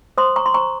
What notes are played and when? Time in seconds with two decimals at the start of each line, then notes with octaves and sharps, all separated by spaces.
0.17 C5 C6 D#6
0.36 A#5 C#6
0.46 C6
0.54 C5 A#5 C#6